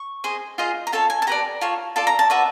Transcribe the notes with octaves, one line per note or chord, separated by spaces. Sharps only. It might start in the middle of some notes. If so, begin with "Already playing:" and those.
Already playing: C#6
G#4 C5 D#5
F4 G#4 C5 D#5
A#5
F4 A4 C#5 A5
G#5
A5
G4 B4 D5 A#5
F4 A4 C#5
F4 A4 D5 A5
A#5
A5
F#4 B4 D5 E5